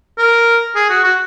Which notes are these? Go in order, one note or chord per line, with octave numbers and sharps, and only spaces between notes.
A#4
G#4
F#4
F#4